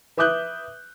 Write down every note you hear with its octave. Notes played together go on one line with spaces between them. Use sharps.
B4 E5 D6 D#6 F#6 G6